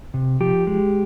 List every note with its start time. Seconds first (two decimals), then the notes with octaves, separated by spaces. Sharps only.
0.14 C3
0.41 F3 G4
0.67 G#3